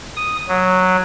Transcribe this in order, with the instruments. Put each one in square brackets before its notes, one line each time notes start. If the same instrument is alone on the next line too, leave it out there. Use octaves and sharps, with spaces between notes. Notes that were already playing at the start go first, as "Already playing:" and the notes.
[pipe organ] D#6
F#3